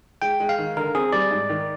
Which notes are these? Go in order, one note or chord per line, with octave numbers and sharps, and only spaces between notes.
G#3 G5
G#3
F5
D#3
D3 A#4
C4 G#4
G3 D5
G#2
D#3